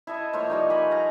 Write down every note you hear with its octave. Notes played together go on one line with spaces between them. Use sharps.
E4 A4 D#5
F3 A#3 F4 C#5
F3 G3 D#4
G#5 B5 C#6
F5 A#5